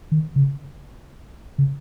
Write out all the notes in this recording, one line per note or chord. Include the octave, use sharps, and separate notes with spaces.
D#3
C#3
C#3